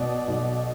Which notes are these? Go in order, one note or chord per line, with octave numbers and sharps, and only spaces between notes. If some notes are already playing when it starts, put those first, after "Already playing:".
Already playing: B2 D5
B1